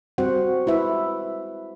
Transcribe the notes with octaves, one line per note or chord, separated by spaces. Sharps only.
G3 C4 F#4 C5 F#5
G#3 E4 B4 E5